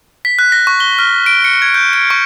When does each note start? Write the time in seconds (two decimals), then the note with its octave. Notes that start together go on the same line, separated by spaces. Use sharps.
0.25 B6
0.39 F#6
0.52 A#6
0.67 C#6
0.80 G7
0.99 F6
1.26 D7
1.45 C#7
1.62 G#6
1.74 G6
1.93 D7
2.10 C#6